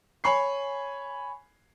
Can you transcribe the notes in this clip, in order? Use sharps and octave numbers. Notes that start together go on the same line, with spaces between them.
C#5 G#5 B5 C#6 C7